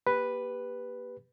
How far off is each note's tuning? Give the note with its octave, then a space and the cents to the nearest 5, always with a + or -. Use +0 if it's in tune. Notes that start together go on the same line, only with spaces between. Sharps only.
A#3 +15 G4 +15 B4 +0